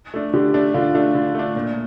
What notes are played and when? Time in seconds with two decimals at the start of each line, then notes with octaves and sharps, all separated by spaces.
0.14 A3 D4
0.33 D3 G4
0.54 A3 D4
0.74 D3 F4
0.94 A3 D4
1.15 D3
1.35 A3 D4
1.55 A#2